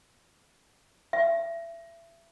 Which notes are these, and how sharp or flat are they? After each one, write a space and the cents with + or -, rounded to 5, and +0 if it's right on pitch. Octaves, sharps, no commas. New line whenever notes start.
E5 +25